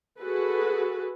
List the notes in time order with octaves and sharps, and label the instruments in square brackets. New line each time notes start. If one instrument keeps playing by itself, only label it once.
[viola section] F#4 G#4 A4 B4